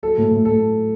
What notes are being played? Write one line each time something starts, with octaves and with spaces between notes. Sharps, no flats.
F#3 A4
A2
A2
A2 A4